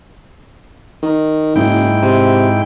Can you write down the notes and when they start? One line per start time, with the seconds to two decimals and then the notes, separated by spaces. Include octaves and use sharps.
1.03 D#3
1.56 F#1 G#2 E4 G5
2.02 C3